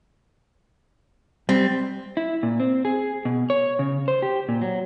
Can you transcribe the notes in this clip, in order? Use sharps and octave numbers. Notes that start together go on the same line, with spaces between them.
G3 C4
E4
A#2
C4
G#4
B2
C#5
C#3
C5
G4
A#2
F#3